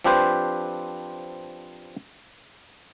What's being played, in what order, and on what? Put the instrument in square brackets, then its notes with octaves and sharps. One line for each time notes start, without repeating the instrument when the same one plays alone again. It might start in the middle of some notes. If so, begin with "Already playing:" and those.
[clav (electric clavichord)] F3 C4 D4 G4 B4 C5